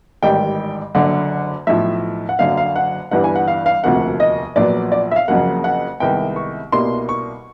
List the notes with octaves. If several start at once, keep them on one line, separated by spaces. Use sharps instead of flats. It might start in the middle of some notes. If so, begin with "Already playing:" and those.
A1 G#2 D#3 G3 G5
F#1 F#2 D3 F#5
B1 A2 F3 E5
F#5
F#1 F#2 D3 F#3 F5
F5
F#5
G1 G2 E3 G3 F#5
G#5
F#5
F5
F5
E1 D2 C3 F3 A#3 F#5
D#5
A#1 A#2 F#3 B3 D5
D5
E5
F5
F#1 F2 C#3 F#3 A#3 F#5
F#5
C2 C3 D#3 G#3 B3 G5
C#6
C2 B2 G3 A#3 C6
C#6